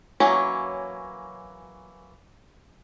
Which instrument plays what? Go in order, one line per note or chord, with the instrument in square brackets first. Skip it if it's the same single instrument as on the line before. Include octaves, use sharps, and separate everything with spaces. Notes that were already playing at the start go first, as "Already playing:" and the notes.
[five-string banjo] E3 F#3 A#3 C#4